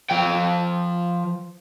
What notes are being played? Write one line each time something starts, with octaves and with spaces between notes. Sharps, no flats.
F3 G5